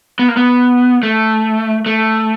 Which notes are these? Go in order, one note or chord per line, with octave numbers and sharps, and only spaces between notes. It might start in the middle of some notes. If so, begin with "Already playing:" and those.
B3
A#3
B3
A3
A3